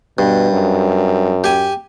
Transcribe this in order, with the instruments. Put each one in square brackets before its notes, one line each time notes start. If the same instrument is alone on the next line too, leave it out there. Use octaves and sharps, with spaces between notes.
[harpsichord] G2 [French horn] B2
[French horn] F#2
[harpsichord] G4 G#5